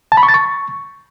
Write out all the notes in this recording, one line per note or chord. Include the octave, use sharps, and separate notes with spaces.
A5
B5
C#6
A6
C#6